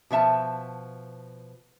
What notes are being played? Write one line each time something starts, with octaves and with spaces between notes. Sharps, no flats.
B2 F3 E5 A5